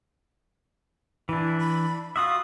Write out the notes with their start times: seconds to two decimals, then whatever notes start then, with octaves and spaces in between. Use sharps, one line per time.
1.29 E3 D4 E4
1.59 B5
2.16 F4 F#4 E5 D#6